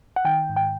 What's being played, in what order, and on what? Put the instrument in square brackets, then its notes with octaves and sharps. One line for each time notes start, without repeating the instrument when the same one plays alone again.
[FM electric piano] F#5
D#3 G5
G#2
G5